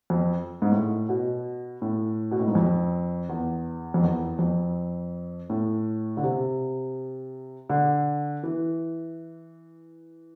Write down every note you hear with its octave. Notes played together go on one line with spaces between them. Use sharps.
F2
G#2
A2
B2
A2
B2
A2
G#2
F2
E2
F2
E2
F2
A2
D3
C3
D3
E3